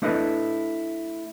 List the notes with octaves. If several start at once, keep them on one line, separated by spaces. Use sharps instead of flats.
A3 D4 E4 A4 B4 D#5